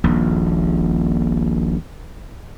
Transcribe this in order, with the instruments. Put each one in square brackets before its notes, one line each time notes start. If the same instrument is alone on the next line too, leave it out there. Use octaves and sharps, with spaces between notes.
[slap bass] D#1 A#1